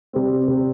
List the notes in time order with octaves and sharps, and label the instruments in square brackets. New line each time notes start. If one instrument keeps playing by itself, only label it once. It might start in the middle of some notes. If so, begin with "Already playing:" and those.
[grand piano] C3 G3 C4
C3 G3 C4